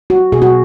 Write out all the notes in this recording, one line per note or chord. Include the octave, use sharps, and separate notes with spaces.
F#4
B2 G#4
F#4